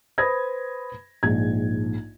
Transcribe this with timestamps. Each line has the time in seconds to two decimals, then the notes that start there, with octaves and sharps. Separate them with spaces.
0.18 B4 C5 B5 D#6 G#6 A#6
1.23 A#1 G#2 G#6